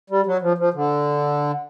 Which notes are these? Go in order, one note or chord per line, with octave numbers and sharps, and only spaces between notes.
G3
F#3
F3
F3
D3